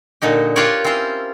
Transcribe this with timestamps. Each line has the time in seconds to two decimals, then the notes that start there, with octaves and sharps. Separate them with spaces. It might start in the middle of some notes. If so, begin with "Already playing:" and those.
0.22 A#2 D3 D#4 G4
0.56 F4 G4 A#4 B4 C#5 D5
0.84 C4 C#4 E4 F4 C5